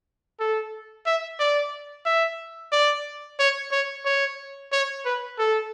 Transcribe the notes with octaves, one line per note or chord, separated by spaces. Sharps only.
A4
E5
D5
E5
D5
C#5
C#5
C#5
C#5
B4
A4